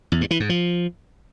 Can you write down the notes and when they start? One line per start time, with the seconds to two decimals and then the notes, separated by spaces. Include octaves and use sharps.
0.12 E2
0.21 G2
0.31 E3
0.40 G#2
0.49 F3